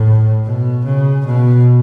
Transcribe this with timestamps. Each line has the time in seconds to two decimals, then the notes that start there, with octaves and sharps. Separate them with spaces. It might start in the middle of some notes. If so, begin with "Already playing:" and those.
Already playing: A2
0.44 B2
0.85 C#3
1.26 B2